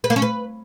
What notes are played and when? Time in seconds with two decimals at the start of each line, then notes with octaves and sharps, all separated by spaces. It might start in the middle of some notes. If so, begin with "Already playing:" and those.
0.04 B4
0.10 A#3
0.16 C#4
0.22 B4